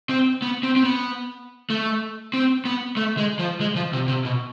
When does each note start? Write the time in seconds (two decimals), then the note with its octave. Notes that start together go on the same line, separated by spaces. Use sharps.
0.09 C4
0.42 B3
0.63 C4
0.76 C4
0.85 B3
1.70 A3
2.33 C4
2.65 B3
2.97 A3
3.17 G#3
3.39 F3
3.61 G#3
3.76 F3
3.93 C3
4.08 C3
4.25 B2